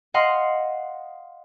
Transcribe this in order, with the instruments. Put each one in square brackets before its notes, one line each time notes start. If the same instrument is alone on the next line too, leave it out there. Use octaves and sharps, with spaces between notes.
[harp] D#5 F5 F#5 C6